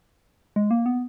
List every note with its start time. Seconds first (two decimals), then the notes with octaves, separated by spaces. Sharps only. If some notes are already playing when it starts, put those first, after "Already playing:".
0.56 G#3
0.71 A#3
0.86 B3